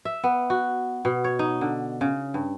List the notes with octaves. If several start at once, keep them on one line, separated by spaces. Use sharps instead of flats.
E5
B3
F#4
B2
C#5
D#4
D3
C#3
G2